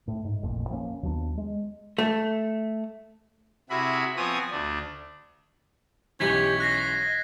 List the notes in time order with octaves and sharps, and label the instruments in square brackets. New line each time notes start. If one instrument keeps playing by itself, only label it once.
[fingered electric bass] A2
G#2
E1 A1 F2 A#2
F3 A#3 B3 C#4
D#2 F#3 B3 D4
G#3
[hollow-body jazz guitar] A3
[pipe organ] C3 E4 F#4 G#4 B5
F3 B3 C4 C#5 G#5 D#6
D2 D4
[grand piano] B1 E3 [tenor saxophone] C#4 [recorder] G4 [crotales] G#6 B6
[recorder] D#5 [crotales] F#6 A#6 C7